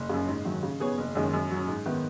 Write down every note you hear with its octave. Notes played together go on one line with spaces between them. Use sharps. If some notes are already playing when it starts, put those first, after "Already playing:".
Already playing: F#1
F#2 C#3
G#2
D#3 F#3
C#3
B3 G#4 C#5
F#1
F#2 D#3 G#3 C#4
F#2
F#3 C#4
G#2
D#3 B3